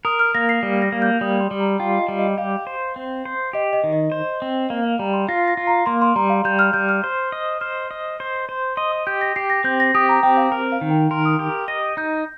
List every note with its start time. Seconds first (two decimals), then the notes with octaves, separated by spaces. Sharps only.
0.05 A#4 D#6
0.19 F6
0.35 A#3 A#6
0.49 C7
0.63 G3
0.82 A#6
0.92 A#3
1.02 G6
1.21 G3 D#6
1.40 C6
1.51 G3
1.60 A#5
1.79 F4 G5
1.99 D#5
2.08 G3
2.19 D#5
2.38 G4 F5
2.67 C5
2.96 C4
3.25 C5
3.53 G4 D#5
3.73 D#5
3.84 D#3
3.92 D#5
4.12 C5
4.42 C4
4.70 A#3 F5
4.85 F5
4.99 G3 A#5
5.13 C6
5.29 F4 A#6
5.48 A#6
5.57 F4
5.67 A#5
5.86 A#3 C6
6.02 C6
6.16 G3 A#5
6.30 F5
6.45 G3 G6
6.59 F6
6.73 G3 G6
6.89 F6
7.04 C5
7.32 D#5
7.61 C5 F6
7.91 D#5
8.20 C5
8.49 C5
8.77 D#5 C6
8.92 D#6
9.07 G4 G6
9.21 A#6
9.36 G4 C7
9.50 A#6
9.64 C4 G6
9.80 A#6
9.95 G4 D#6
10.09 A#5
10.23 C4 G5
10.37 F5
10.52 A#4
10.72 F5
10.81 D#3
10.90 G5
11.11 A#4 C6
11.25 D#6
11.39 G4
11.68 D#5 A#6
11.97 D#4 G6